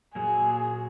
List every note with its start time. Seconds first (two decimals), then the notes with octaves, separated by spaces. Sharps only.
0.15 A#2 F#3 A#3 G#4